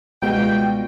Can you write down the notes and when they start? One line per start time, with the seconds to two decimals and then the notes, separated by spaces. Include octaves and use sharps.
0.23 C#2 B2 G3 G#3 F4 F#4 G5